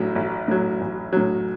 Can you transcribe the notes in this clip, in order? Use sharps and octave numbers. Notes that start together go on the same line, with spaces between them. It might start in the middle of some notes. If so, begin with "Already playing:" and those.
Already playing: A1 A2 F#3
A1
A2 F#3
A1
A2 F#3